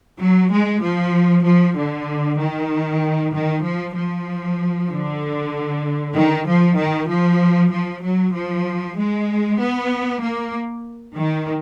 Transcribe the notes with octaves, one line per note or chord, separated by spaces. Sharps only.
F#3
G#3
F3
F3
D3
D#3
D#3
F3
F3
D3
D#3
F3
D#3
F3
F3
F#3
F3
G#3
B3
A#3
D#3